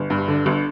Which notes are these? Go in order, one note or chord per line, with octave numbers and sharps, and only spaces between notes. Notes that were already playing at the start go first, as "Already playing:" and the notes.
Already playing: G1
G2
D3
G1